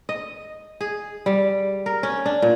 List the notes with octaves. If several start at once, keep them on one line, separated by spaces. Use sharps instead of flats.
D#5
G#4
G3
A#4
C#4
D4
A#2